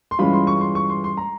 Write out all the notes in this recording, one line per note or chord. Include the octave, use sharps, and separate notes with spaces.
C6
G2 E3 G#3 C#4 F4 B5
C6
C#6
C6
C#6
C6
C6
A#5